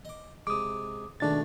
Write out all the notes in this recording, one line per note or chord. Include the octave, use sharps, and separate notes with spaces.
D#5 D6
C3 G#3 D6 D#6
C#2 B2 D#3 A3 D4 A6